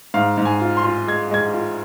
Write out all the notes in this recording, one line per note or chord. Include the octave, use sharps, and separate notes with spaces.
G#2 F5
G#2
G#5
F4
C6
F4
G#3 G#6
G#3 G#6
F4